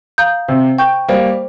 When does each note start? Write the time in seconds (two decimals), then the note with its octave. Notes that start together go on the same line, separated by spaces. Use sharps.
0.18 F5 A#5 D#6 G6
0.48 C3 C5
0.78 G5 C#6 G6
1.08 G3 A#3 C5